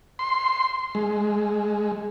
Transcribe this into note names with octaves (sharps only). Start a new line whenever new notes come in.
C6
G#3